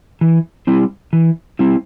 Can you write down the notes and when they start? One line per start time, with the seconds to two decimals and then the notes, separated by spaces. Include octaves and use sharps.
0.21 E3
0.67 G3 C4 E4
1.13 E3
1.59 G3 C4 E4